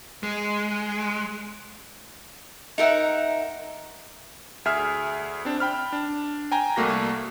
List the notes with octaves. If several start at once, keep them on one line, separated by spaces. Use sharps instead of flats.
G#3
D#4 A#4 E5 F#5
D2 G#4 E5 F6
C4 D4
G5 B5 F6
D4
G5 G#5 A#5
C2 A3 A#3 F#4 A#6